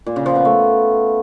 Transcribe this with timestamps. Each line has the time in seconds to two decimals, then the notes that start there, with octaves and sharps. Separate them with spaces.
0.06 A#2
0.16 C#3
0.26 F3
0.35 B3
0.45 A3